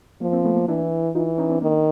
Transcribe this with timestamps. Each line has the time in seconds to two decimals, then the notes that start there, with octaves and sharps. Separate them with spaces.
0.21 F3 A#3
0.33 A#3 C4
0.45 A3 B3
0.56 A#3
0.68 E3 D4 E4
1.15 E3 D#4 F4
1.38 C#4 D#4
1.49 C4 D4
1.61 D#3 A#3